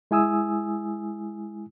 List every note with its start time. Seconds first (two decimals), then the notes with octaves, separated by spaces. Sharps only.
0.11 G#3 E4 G#5 D#6 E6